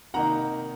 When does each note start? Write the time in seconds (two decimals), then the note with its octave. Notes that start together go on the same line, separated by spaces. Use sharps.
0.14 C3 D#3 A#3 D#4 F#5 A#5